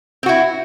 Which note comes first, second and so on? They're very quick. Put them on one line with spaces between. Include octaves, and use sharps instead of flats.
C4 F#4 E4